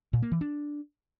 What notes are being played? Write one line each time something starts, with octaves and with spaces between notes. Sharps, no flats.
A#2
A#3
E3
D4